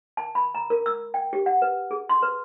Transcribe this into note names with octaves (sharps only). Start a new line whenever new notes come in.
A5
B5
A#5
A#4
E6
G5
G4
F#5
B4
G#4
C6
B4